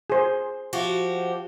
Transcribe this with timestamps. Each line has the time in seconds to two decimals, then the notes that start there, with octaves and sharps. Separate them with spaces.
0.10 G#4 C5
0.73 F3 F#4 G4